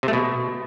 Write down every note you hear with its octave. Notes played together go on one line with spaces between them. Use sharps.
C3
A3
B2